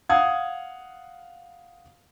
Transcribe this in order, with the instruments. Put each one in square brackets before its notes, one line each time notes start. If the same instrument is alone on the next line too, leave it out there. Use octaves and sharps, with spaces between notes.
[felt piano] F5 F#5 D#6 G#6